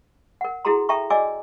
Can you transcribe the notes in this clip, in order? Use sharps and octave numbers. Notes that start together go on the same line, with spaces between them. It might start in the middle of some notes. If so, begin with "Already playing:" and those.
A#4 F#5
E4 F#4 G#4 A4 A#5 C6
A4 E5 G5 A#5 C#6
F#4 D5 D#5 G#5 D6 E6